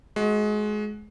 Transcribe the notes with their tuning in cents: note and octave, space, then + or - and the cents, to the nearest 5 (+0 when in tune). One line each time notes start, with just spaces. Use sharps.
G#3 +25 F#4 +0